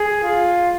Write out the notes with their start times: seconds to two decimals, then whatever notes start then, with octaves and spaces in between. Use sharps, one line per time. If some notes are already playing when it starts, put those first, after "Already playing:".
Already playing: G#4
0.24 F4